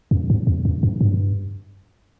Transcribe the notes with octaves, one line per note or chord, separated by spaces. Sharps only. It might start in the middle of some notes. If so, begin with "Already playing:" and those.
F2
G2
E2
F2
F#2
G2